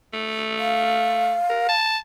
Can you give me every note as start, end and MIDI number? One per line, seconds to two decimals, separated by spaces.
0.13 1.36 57
0.58 1.73 77
1.49 1.67 70
1.69 1.98 81